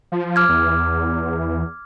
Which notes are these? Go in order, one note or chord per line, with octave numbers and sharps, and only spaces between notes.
F3
D6 F6 G#6
E2